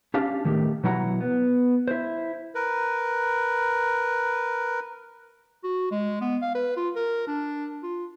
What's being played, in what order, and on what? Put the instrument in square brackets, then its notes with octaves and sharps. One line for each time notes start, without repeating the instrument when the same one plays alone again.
[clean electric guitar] C#4 D4 G4 F5 A5
A2 D#3 A3 G4
B2 F#3 E4 F#5 A#5
B3
E4 C5
[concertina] A#4 B4
[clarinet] F#4
G#3
B3
F5
B4
F4
A#4
D4
F4